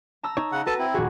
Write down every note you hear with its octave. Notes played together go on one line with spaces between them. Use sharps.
A5 A#5 E6
D#4 C#5
C#3 F#5
F#4 A4 B4 A5 A#6
C4 E4
D#1 F#4 G#4